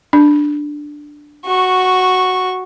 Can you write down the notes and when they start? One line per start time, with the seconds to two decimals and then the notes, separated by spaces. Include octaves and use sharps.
0.13 D4
1.47 F#4 C#6